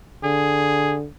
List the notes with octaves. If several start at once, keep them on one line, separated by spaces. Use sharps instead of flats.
D3 G#4